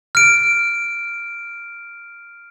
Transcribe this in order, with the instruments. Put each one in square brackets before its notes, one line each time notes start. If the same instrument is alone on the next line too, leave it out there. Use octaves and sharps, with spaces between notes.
[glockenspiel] F6 D7